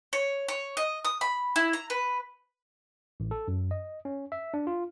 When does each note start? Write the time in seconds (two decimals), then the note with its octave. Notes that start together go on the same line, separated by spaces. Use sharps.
0.13 C#5
0.48 C#5
0.77 D#5
1.05 D#6
1.21 B5
1.56 E4
1.73 A#5
1.90 B4
3.20 A1
3.31 A4
3.48 F#2
3.71 D#5
4.05 C#4
4.32 E5
4.54 D4
4.67 F4